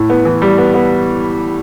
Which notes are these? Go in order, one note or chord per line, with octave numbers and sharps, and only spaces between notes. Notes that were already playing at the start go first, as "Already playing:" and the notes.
Already playing: A2
B3
E3
G3
B3
B3